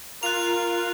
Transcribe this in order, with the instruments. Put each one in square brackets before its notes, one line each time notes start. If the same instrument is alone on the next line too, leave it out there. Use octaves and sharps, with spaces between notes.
[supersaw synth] F4 [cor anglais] A#4 [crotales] F#6 F7